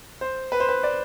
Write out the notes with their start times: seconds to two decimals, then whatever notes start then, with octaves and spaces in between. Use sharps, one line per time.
0.21 C5
0.52 B4
0.60 C5
0.69 B4
0.83 D5